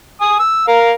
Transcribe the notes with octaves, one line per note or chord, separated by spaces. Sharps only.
G#5 D#6
E6
A#4 F5